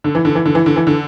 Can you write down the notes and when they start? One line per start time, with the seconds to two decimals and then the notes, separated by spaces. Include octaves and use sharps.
0.04 D3
0.15 E3
0.25 D3
0.35 E3
0.46 D3
0.55 E3
0.66 D3
0.76 E3
0.87 D3